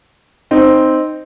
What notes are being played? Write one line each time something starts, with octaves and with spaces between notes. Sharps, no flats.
C4 D#4